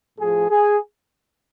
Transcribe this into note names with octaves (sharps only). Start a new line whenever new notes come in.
A2 F3 G#4
G#4